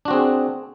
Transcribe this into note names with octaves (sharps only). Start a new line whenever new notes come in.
C4 D4 F#4 G#4